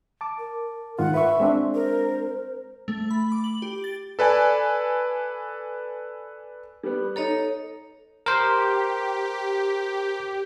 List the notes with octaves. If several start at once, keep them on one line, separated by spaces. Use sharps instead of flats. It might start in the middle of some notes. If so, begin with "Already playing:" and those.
A5 D6
A#4
G#2 D#3 F4 F#5
B4 E5 C#6
G#3 C4 D4
A#4 C5
A3
B5
D6
F#7
G4
A6
A4 B4 D5 G#5
G3 B3
D#4 A4 C#5 D#5 A#5
G4 A#4 C5